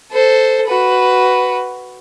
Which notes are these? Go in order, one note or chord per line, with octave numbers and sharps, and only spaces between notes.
A4 C5
F#4 B4